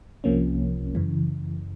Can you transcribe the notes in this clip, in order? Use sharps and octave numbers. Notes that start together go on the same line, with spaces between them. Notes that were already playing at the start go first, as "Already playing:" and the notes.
C2 C3 F3 A#3 C#4
F#2 C#3 E3